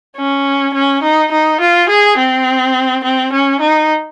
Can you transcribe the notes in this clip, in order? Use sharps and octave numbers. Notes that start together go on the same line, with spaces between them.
C#4
C#4
D#4
D#4
F4
G#4
C4
C4
C#4
D#4